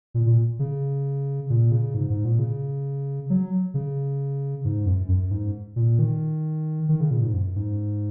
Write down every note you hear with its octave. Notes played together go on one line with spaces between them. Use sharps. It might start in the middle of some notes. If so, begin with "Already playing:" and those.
A#2
A#2
C#3
A#2
C#3
G#2
G#2
A#2
C#3
F#3
C#3
G#2
F#2
F#2
G#2
A#2
D#3
D#3
C#3
A#2
G#2
F#2
G#2